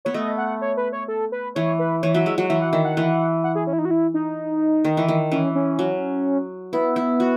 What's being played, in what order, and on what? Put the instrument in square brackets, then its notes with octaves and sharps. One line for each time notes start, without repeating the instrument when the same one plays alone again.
[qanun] B3 [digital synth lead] C#5
[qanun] A3 [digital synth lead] D#5
[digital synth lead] F#5
C#5
B4
C#5
A4
B4
[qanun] E3 [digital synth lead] C#5
[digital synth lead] B4
[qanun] E3 [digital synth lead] C#5
[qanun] F#3 [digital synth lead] E5
[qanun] G#3 [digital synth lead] E5
[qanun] F#3 [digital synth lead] F#5
[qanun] E3 [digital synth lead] E5
[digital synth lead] F#5
[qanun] D#3 [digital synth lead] E5
[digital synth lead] F#5
[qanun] E3
[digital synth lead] F#5
G#4
C#4
E4
D#4
F#4
E4
D#4
[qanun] D#3
E3
D#3
[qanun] E3 [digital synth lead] C#4
[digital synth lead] C#4
[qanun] F#3
[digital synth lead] B3 [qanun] E4
[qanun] E4
F#4